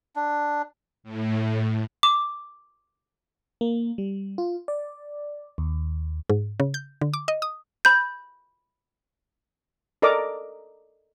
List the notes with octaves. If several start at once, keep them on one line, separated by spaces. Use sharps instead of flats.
D4
A2
D6
A#3
G3
F4
D5
D#2
G#2
C#3
G6
D3
D6
D#5
D#6
B5 G6
A4 A#4 D5 D#5 A#5 D6